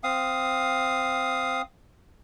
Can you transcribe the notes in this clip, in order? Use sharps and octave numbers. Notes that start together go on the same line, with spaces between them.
C4 F5 D#6